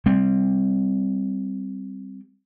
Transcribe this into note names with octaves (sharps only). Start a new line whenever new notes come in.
G3 C4